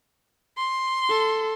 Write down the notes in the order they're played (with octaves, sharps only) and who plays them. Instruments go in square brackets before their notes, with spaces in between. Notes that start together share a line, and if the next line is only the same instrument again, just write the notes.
[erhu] C6
[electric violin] A4